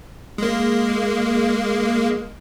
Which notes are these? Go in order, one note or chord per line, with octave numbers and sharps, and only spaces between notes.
G#3 A#3